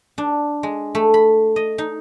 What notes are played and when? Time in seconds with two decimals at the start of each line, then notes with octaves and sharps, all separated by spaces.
0.18 D4
0.63 G#3
0.95 A3
1.14 B5
1.56 D#5
1.78 D#4